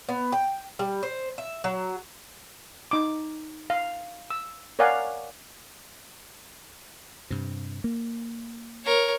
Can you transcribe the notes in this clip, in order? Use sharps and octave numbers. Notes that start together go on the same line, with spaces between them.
B3
G5
G3
C5
E5
F#3
D#4 D6
F5
E6
A#4 C#5 D5 F5 F#5 G#5
G2 C3
A#3
A#4 C#5